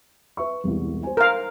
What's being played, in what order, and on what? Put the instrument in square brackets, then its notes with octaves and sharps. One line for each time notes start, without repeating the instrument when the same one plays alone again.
[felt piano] B4 E5 C#6
E1 C2
C5 G#5
[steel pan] A#4 F5